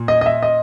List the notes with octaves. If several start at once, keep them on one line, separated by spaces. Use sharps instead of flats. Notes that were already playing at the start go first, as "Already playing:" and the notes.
Already playing: A#2
D#5
D#5
E5
D#5